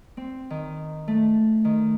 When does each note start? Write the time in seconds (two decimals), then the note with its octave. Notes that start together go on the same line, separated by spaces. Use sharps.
0.17 C4
0.50 D#3
1.08 A3
1.65 D#3